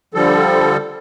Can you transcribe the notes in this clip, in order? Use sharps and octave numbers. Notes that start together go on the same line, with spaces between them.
D3 F3 G3 A4